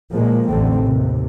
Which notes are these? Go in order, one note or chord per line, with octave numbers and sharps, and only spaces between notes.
A#2 F3 G#3 A#3
A1 E2 D3 A3 C4
D#2 C3